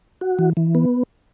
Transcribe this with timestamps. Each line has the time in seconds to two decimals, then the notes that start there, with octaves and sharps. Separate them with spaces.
0.21 F#4
0.39 E3
0.57 E3
0.75 B3